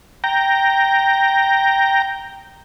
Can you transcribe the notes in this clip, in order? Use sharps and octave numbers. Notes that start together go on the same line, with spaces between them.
G5 A#5